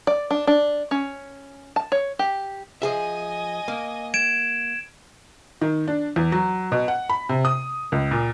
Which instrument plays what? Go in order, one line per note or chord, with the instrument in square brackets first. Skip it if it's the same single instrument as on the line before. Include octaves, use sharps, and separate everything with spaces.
[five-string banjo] D5
D4
D4
C#4
A5
C#5
G4
[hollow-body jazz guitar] F3 G#4 E5 [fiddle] D#5 G#5
[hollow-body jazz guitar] A#3
[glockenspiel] G#6 D7 E7
[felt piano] D#3
D4
E2
F#3
B2
F#5
B5
C3
D#6
C#2
A#2